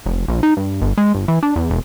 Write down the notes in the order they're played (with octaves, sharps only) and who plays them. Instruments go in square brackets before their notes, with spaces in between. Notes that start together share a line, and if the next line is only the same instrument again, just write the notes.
[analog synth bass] F1
A#1
D#4
G2
G1
G#3
G1
E3
D4
E2
E1